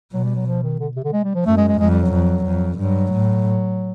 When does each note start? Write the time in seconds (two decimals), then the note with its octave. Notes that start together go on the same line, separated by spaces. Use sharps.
0.13 B2 F#3
0.24 G3
0.35 F#3
0.46 F3
0.63 D#3
0.80 D3
0.96 C3
1.04 D3
1.13 G#3
1.24 G3
1.35 F3
1.46 F#2 A3
1.57 G#3
1.68 G#3
1.79 F2 G#3
1.90 G3
2.01 F#3
2.13 F2
2.46 F2
2.79 G2 F#3
3.12 A2